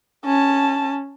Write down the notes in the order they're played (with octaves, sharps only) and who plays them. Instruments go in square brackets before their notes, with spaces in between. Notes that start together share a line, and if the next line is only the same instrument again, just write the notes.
[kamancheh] C#4 A5